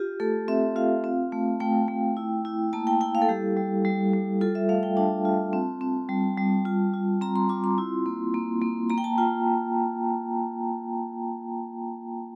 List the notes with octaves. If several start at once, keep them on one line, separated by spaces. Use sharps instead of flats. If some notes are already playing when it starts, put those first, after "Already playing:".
Already playing: F4 G4
A3 A4
C4 E5
F4 F5
C4
A3
A3 G5
A3
E4
E4
A#3 A5
G5
E4 G5
F5
A4
G3 G4
G3
G3
G3
F4 A4
E5
A3 F5
G5
D4 A5
F4
C4
C4
G3
G3
F4
F4
C4 A#5
C6
F4 D6
C6
E4
A#3
A#3
A#3
A#3 A#5
G5
A5
F4 G5